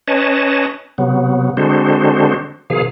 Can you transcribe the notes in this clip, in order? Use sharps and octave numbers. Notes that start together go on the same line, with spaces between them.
C#4 B4 C#5 D#5 A5
C3 F#3 B3
D3 G#3 C4 D4 F#4 C5
B2 D#3 F3 G#4 F5